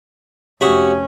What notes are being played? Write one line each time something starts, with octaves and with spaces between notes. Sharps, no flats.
F1 C#4 F#4 G4 C#5 E5 D#6